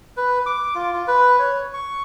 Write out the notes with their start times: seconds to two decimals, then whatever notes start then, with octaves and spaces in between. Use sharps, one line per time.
0.17 B4
0.46 D6
0.75 F4
0.93 F4
1.08 B4
1.39 C#5
1.74 C#6